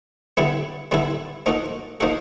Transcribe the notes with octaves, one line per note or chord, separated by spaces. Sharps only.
D3 G3 B3 E4 A4
D3 G3 B3 E4 A4
F3 A#3 D#4 F#4 A4
F3 A#3 D#4 F#4 A4